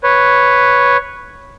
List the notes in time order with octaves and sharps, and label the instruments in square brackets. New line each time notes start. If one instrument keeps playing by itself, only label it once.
[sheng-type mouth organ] B4 C#5